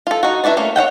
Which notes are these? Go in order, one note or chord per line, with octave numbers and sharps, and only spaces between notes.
F4 A4
D#4 F#4
D4 E4 F#4 B4 D5
A3 A#3 C#4
C#5 E5 F#5 G5